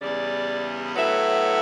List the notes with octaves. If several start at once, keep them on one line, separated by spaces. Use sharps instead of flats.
E2 C#3 G3 D5
A2 F#3 B3 E5